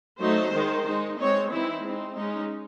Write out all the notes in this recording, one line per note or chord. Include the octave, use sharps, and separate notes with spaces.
F#3 A3 D#4 C5
D#3 G#3 D#4
G#3 D#4
G#3 C4 D#4 C#5
E3 C4 D#4 E4
G#3 C4 D#4
G#3 C#4 D#4